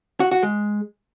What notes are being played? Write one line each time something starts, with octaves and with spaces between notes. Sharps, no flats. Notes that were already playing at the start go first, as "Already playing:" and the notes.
F#4
F#4
G#3